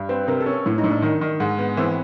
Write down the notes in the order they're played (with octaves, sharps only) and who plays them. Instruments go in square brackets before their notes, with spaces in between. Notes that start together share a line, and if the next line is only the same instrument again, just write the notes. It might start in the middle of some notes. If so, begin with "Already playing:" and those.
Already playing: [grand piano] G2
[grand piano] C4 [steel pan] B4
[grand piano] C3 [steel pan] A#4
[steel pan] A4
[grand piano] C#4
[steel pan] A4
[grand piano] A2 [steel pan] E4
[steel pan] D#4
[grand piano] A2
[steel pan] D4
[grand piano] D#3 [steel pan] D#4
[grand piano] D#3
G#2
B3
[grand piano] E3 [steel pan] C4